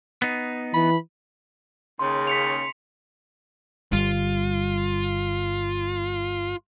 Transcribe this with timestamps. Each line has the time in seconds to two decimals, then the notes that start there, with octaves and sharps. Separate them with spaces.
0.22 B3 D#4
0.74 E3 B5
1.99 D#2 C#3 C6
2.27 B6 C#7 F7
3.93 G1 G3 F4